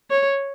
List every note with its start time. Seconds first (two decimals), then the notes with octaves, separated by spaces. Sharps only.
0.10 C#5